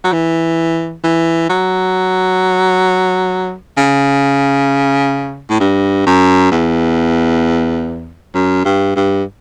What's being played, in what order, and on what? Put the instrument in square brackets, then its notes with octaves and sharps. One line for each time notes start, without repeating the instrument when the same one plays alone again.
[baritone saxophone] F#3
E3
E3
F#3
C#3
A2
G2
F#2
E2
F#2
G2
G2